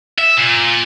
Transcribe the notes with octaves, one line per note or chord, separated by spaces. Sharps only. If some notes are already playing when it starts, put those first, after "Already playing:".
E5
A#2